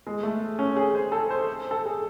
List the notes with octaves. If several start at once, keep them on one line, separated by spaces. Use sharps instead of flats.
G#3
A3
C#4
G#4
C5
A4
C5
A4
G#4